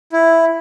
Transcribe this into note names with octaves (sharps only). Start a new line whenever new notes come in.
E4